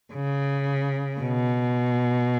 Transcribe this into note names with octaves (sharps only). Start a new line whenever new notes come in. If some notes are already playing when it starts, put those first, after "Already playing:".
C#3
B2